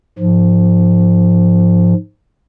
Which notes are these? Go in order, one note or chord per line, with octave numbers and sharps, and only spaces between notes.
G#2 F3